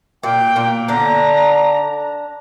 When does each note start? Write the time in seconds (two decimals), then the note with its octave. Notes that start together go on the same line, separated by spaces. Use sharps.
0.23 A#2 A#3 G5
0.56 A#2 A#3
0.88 D3 D4 A#5